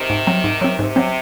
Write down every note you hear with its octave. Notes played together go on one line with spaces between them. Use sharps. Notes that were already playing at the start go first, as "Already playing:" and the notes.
Already playing: C3 D#3
G#2
F#3 C4
G#2
F#3 C4
G#2 C3
F#3 C4